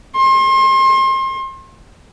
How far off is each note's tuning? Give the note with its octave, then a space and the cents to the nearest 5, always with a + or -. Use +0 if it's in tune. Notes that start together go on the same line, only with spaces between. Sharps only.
C6 +35